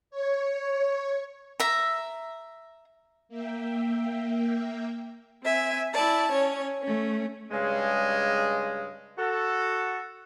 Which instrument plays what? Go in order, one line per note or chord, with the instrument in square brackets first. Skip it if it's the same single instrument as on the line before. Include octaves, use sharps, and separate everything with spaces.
[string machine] C#5
[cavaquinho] E5 A#5
[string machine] A#3 E5 G5
[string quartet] C4 E5 G#5
E4 D5 A5
C#4 C#5
A3 C#4
[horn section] G2 C#3 G#3
F#4 A4